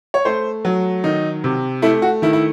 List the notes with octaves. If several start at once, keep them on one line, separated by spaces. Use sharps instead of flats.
C#5
A3 C5
F#3
D#3 D#4
C3
A3 E4
F#4
D#3 E4
E4